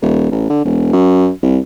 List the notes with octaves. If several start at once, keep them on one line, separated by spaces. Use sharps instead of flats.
D#1
A1
D3
E1
F#2
C2